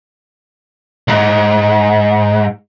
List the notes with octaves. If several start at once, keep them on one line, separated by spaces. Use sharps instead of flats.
C2 G#2